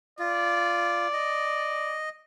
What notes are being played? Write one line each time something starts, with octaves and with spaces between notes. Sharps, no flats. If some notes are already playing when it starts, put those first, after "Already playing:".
F4 D5
D#5